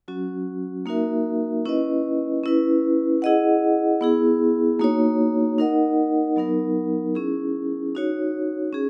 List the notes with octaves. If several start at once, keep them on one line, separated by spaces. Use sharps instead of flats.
F#3 C#4 F#4
A#3 D#4 F#4 A#4 E5
C#4 E4 B4 D#5
C#4 E4 B4
E4 G#4 D#5 F#5
B3 E4 G#4
A#3 D#4 F#4 C#5
D#4 A#4 D#5 F#5
F#3 B3 D#4 A#4
C#4 E4 G#4
D#4 F#4 C#5
C#4 G#4